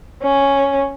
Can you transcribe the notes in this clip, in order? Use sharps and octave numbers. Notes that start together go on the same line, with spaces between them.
C#4